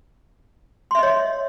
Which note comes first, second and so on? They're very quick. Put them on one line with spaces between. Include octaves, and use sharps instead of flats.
C6 E5 D#5 C#5